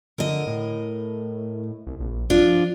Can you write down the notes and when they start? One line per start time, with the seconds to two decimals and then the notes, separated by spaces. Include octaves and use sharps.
0.18 D3 A#4 D#5
0.47 A2
1.87 C2
2.00 A#1
2.30 F3 D4 F4